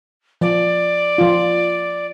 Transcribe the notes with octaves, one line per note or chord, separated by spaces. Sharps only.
F3 D5
F3 F4